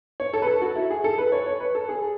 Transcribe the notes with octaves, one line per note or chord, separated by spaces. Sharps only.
C#5
A4
B4
A4
F#4
E4
G#4
A4
B4
C#5
C#5
B4
A4
G#4